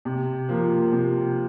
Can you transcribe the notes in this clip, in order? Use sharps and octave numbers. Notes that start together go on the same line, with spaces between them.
C3
F3 A#3
C3